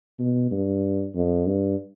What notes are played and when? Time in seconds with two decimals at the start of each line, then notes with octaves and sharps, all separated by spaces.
0.19 B2
0.51 G2
1.15 F2
1.47 G2